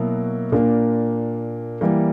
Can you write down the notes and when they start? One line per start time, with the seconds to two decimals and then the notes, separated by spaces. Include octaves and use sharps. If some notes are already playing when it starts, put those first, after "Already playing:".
Already playing: B2 F#3 A#3 E4
0.52 A#2 A#3 D4
1.81 E3 G3 A#3